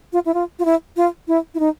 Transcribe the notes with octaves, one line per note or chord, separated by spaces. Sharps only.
F4
E4
F4
F4
E4
F4
E4
E4
D#4